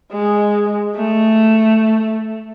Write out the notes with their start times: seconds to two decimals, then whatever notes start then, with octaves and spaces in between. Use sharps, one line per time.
0.12 G#3
0.95 A3